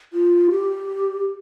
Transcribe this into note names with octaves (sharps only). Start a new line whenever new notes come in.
F4
G4